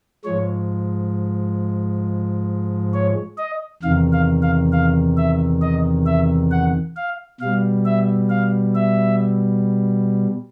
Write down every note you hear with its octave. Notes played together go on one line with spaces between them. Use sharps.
G#2 F3 G#3 C#5
C#5
D#5
E2 C3 D#3 F5
F5
F5
F5
E5
D#5
E5
F#5
F5
B2 G3 F5
E5
F5
E5